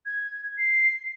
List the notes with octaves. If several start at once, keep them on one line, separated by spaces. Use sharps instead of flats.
G#6
C7